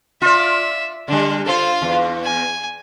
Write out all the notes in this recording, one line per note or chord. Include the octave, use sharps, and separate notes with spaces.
F4 D5 E5
D3 G3 D4
F4 A4 C5 F5
E2
G#5